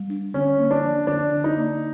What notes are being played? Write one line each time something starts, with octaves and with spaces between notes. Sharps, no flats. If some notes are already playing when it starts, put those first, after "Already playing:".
Already playing: G3
D4
D3 C#4
A#3
D4
F3
D3 D4
D3
D#4
A#3